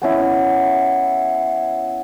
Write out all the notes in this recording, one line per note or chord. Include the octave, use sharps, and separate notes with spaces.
B3 C#4 E4 D#5